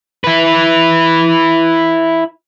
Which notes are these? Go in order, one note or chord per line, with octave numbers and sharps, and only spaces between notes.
E4 B4